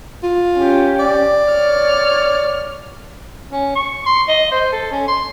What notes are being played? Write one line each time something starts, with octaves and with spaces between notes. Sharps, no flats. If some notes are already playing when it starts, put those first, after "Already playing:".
F4
C#4 G4
D5
C#5 F6
C#4
C#6
C6
D#5
C5
A4
C#4
C6